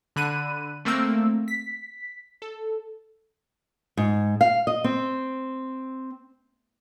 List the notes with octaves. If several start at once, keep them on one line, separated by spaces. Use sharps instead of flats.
D3 B5 F#6 D#7
A3 A#3 C4 E6
B6
A4
G#2
F5
D#5
C4